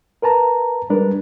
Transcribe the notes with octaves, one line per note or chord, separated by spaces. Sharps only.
A#4 B4 A5 A#5
G3 G#3 D4 A#4 B4